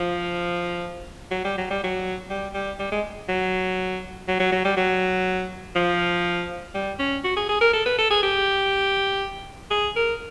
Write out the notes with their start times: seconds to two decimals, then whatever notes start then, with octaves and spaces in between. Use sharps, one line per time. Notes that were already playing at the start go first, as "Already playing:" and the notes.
Already playing: F3
1.31 F#3
1.45 G3
1.57 F#3
1.70 G3
1.84 F#3
2.30 G3
2.54 G3
2.79 G3
2.91 G#3
3.29 F#3
4.28 F#3
4.40 F#3
4.52 F#3
4.64 G3
4.77 F#3
5.75 F3
6.74 G3
6.99 C#4
7.24 F#4
7.36 G#4
7.49 G#4
7.61 A#4
7.73 A4
7.86 B4
7.99 A4
8.11 G#4
8.23 G4
9.71 G#4
9.96 A#4